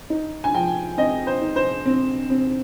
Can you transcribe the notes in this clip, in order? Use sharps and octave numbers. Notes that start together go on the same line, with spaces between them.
D#4
G#5
F3 G5
C4 D#5
C5
D#4
C5
C4
C4